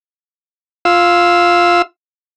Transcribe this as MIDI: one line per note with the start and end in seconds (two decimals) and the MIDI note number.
0.85 1.82 65
0.85 1.82 77
0.85 1.82 88